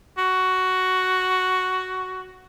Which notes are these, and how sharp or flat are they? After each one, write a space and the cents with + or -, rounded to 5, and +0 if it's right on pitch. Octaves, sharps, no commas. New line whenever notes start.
F#4 +5